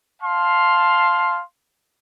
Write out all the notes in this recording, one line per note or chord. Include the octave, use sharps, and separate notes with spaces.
F5 A5 C6